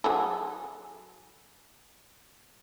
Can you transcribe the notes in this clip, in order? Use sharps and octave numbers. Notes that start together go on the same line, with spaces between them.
F#3 G#4 A4